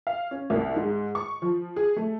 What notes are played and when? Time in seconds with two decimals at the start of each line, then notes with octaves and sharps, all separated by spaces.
0.07 F5
0.31 C#4
0.50 C2
0.76 G#2
1.15 C#6
1.42 F3
1.76 G#4
1.96 A3